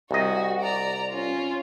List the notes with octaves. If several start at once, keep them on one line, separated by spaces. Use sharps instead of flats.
C2 F#4 D#5
D5 A#5
C#4 F4